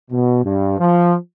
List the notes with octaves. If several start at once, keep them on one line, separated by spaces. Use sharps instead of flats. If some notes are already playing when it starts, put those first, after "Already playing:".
B2
G2
F3